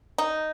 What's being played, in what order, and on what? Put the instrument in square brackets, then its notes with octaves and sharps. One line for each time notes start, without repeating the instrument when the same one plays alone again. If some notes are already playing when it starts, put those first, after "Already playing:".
[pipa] D#4